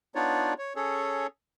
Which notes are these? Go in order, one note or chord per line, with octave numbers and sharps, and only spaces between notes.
B3 D4 D#4 F4 C#5 D5
C#5
C#4 G#4 A4 C#5